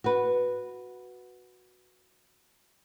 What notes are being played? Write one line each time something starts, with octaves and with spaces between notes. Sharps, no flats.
F#4 B4